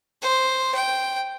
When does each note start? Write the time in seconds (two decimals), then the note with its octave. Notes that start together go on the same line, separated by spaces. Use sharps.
0.22 C5
0.74 G5